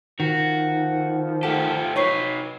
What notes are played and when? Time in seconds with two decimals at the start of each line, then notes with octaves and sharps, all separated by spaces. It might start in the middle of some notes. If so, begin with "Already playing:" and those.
0.20 D#3 F3 F#4
1.43 A3 G4 A4 F#5 A5
1.96 D#4 B4 C#5 C#6 C7